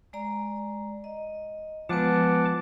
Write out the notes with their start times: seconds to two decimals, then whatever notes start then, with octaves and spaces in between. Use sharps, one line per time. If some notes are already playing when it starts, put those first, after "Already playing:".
0.13 G#3 D5 A#5
1.04 D#5
1.89 F3 G#3 B3 B4 F#5 A5 D6